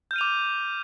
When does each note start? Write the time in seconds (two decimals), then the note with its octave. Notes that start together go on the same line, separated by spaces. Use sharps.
0.11 G6
0.13 F6
0.16 D#7
0.18 F7
0.21 D6